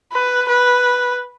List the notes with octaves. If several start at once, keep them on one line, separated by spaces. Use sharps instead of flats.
B4
B4